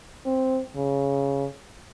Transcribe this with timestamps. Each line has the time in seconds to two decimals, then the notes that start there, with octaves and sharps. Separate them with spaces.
0.26 C4
0.76 C#3